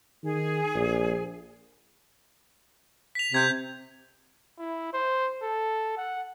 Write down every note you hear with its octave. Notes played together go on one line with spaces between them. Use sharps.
D#3 G#4
A#1
B6 F7
C3 G6 G#6 F7
E4
C5
A4
F#5